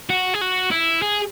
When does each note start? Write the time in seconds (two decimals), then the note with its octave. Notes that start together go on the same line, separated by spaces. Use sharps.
0.10 F#4
0.34 G#4
0.41 F#4
0.71 E4
1.02 G#4